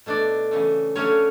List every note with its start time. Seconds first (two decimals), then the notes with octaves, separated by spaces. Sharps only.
0.06 B2 A3 D4 D5
0.51 C#3 E3 A3
0.96 D3 F#3 A3 C#4 C#5